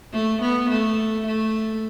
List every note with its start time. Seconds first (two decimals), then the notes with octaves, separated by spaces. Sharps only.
0.13 A3
0.41 B3
0.70 A3
1.26 A3